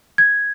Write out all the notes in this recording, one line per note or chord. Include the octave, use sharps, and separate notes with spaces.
G#6